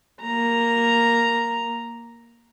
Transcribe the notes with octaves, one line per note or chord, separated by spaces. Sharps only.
A#3 A#5